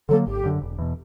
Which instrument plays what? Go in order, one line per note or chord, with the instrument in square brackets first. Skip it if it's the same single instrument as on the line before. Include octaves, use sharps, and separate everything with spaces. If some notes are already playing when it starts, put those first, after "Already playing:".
[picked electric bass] D3 F#3 A#3 [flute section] A4
[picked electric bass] G#1 [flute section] G4
[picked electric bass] F#2 D3
E1
E2 B2